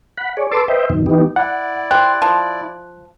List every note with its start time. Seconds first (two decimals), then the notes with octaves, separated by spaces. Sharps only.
0.18 F#5 B5
0.37 G#4 C#5 D5
0.51 A4 B4 A5 C6 D6 E6
0.68 B4 C5 D#5 E5 G5
0.90 F#2 B2 D#3
1.06 E3 B3 D#4 G4
1.36 E4 D5 F#5
1.91 G4 C5 F#6
2.22 F3